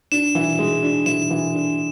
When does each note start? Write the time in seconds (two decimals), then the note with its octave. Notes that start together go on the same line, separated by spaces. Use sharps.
0.12 D4 E7
0.35 E3
0.59 G#3
0.83 D4
1.06 E3 E7
1.30 E3
1.54 D4